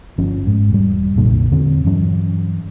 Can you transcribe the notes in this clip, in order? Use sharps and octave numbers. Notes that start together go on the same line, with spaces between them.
G1 F3 C#4
G#2
E1 G3
F1 B1 A#2 D3
E2 D3 C4
G2 E3 F#3 C#4